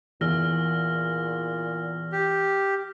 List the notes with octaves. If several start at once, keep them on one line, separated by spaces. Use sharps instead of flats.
E2 A#2 E6 F6 A#6
G4